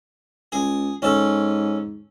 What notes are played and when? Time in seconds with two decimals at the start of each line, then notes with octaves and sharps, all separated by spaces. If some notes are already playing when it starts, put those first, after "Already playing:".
0.52 C#2 G#4
1.02 G#2 C#4 A4